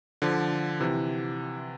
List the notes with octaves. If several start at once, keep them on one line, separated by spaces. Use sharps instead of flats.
D3 F3
C3 E3